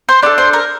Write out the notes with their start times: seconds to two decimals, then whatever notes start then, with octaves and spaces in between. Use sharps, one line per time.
0.09 C5
0.23 D4 F4 A4 D5
0.38 C5
0.53 A#4